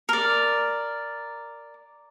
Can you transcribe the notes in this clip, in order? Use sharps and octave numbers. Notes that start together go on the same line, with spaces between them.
A#4 D5